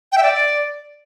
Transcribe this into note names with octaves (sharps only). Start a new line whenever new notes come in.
G5
E5
D5